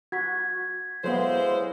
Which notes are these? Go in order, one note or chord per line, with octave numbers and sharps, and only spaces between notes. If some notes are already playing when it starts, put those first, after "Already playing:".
F#4 G#6 B6
F#3 G#3 B3 E4 A4 C5 C#5 F5